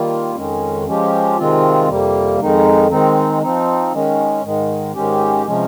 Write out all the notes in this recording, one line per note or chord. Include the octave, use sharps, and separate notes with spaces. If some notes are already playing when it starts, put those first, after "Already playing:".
Already playing: D#3 G3 A#3 F4
F2 D#3 G#3 C#4
F3 G#3 C#4 G4
C3 D#3 G#3 C4 F4
F2 C3 G3 A#3
F2 D#3 G#3 D#4
D#3 G#3 C4 D#4
F3 C4 D#4
D#3 G#3 C#4
G#2 D#3 G#3
G#2 D#3 G#3 C#4 G4
C3 F3 G#3 C#4